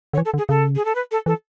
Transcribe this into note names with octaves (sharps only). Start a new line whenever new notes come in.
D3 C#5
E3
A4
D3
G#4
C#3 A4
G#4
A4
B4
A4
E3 A4